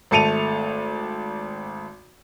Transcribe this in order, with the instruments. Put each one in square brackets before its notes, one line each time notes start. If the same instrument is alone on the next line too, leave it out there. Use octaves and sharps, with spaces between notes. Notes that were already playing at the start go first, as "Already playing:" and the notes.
[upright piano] G#1 A3 A5 C#7 D#7 F7